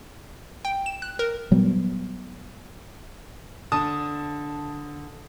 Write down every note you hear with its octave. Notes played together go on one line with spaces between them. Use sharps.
G5
E7
F#6
A#4
A#2 F#3 G3 B3
D3 A5 D#6